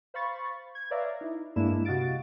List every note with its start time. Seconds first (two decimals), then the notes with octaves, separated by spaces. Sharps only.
0.14 C5 F5 B5 C#6 A6
0.75 G#6
0.90 B4 C#5 D5 E5 F5 A#5
1.21 D#4 E4
1.56 G2 G#3 A#3 D4 E4 E7
1.85 C3 F#4 D#5 F5 A6 D7